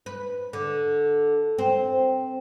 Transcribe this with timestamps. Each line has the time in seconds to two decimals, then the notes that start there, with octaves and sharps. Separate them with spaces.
0.06 B4
0.53 D3
1.58 C4